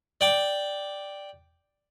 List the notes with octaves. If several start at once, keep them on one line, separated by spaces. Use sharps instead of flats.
D5 G5 D6